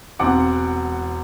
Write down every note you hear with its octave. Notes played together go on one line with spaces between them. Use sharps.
E1 C4 F#5 D6